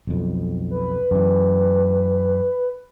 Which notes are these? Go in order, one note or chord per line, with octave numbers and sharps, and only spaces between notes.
B1 F2
B4
F#2 E3